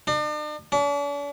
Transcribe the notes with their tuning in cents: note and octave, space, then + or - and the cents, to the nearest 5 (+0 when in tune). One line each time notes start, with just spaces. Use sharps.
D4 +45
D4 -45